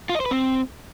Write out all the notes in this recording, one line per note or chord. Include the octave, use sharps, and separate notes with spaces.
F4
D#5
C5
B4
C4